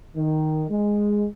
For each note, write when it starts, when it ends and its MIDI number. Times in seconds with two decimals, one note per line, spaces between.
0.16 0.64 51
0.70 1.26 56